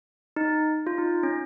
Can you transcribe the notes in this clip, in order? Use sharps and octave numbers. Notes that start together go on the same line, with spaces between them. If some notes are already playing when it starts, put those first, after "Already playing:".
D#4
F4
D#4
C#4